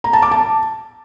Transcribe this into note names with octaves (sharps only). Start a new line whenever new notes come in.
A#5
A5
D6
A5